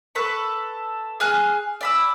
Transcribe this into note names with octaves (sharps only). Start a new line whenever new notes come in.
A4 B4 C#6
G#4 G#5 F6 F#6
D5 B5 E6